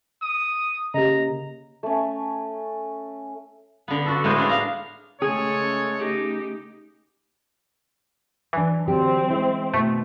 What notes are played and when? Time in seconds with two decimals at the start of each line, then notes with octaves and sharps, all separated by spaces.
0.22 D#6
0.94 C#3 A#3 G4 D#5 A#5
1.83 A3 C#4
3.88 D3 B3
4.06 D4 F#4 A4
4.24 A2 G#3 B3 D#4 C5
4.38 B3 D4 F5
4.49 F5 A#5
5.22 C#3 G#3 A3 G#4 A4 C#5
5.98 D#4 G4
8.53 E3 F#3 D4
8.88 D3 F#3 C4 G4
9.30 G#3 E4
9.74 B2 D#3 A3